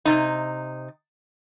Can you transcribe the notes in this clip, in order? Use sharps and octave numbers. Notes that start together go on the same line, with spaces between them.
C3 D#4